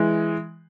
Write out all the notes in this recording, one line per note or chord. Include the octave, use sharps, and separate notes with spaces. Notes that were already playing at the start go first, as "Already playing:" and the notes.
Already playing: E3 G#3